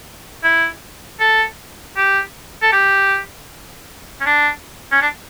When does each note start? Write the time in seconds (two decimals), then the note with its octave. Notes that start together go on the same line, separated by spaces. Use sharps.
0.44 E4
1.20 A4
1.97 G4
2.62 A4
2.72 G4
4.21 C#4
4.26 D4
4.92 C#4
5.02 D4